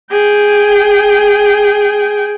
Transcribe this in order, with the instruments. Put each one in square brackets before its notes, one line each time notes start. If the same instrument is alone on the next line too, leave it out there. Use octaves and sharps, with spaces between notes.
[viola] G#4 G5